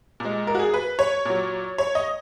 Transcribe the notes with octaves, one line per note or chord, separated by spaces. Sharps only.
A#2 G#3
A#4
F#4
G#4
B4
C#5
A#2 F#3
C#5
D#5